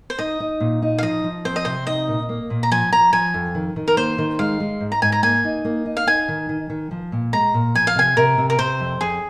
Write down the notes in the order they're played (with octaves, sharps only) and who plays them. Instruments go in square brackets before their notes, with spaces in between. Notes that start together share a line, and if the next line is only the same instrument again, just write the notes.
[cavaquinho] C5
[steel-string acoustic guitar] D#4 [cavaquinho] D#5
[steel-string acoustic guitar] D#4
A#2
D#4
[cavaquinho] F5
[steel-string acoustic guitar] F3 [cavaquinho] D#5
[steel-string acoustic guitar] F3
[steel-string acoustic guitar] C4 [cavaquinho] C5
[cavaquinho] D#5
[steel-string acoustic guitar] C3 [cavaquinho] C5
[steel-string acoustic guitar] D#4 [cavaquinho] D#5
[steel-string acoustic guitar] A#2
A#3
A#2
[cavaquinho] A#5
[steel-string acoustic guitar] F3 [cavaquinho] G#5
[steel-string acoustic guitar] F3 [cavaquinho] A#5
[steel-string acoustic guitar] F3 [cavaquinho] G#5
[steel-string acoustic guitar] F2
D#3
D#3
[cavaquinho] A#4
[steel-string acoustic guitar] A#3 [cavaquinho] C5
[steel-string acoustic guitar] D#3
[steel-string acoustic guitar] G#3 [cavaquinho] F5
[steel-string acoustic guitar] G#3
G#2
[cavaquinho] A#5
[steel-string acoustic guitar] G#2 [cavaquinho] G#5
[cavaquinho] A#5
[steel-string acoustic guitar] A#3 [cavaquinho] G#5
[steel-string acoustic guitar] D#4
A#3
D#4
[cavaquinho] F5
[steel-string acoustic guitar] D#4 [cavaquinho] G#5
[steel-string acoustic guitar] D#3
D#3
D#3
F3
A#2
[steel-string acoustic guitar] G#3 [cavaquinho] A#5
[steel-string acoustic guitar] A#2
[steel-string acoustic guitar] F3 [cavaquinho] G#5
[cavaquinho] F5
[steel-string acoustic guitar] C3 [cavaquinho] G#5
[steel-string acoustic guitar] C3 [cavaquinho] A#4
[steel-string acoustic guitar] C3
[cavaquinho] A#4
[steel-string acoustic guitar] C3 [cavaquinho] C5
[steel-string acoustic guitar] F2
[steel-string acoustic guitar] F2 [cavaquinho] G#4